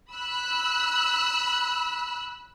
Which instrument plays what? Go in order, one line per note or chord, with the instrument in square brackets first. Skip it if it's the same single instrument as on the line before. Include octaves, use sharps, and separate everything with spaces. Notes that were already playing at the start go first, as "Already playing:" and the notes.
[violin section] B5 E6 F#6